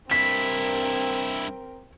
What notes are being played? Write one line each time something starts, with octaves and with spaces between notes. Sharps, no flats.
G2 C4 E4 A#4 B6